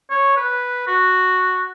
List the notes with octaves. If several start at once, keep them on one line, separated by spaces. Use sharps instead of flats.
C#5
B4
F#4